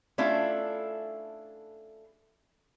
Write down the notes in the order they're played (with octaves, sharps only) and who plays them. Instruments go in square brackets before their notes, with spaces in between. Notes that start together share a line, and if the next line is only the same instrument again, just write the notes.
[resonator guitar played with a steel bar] A3 C#4 D4 E4 F4 A4